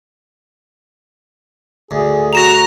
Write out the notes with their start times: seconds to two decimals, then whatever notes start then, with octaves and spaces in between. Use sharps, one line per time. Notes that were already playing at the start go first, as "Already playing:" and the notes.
1.91 D2 G#4
2.33 F#4 A#5 A#6 E7 F7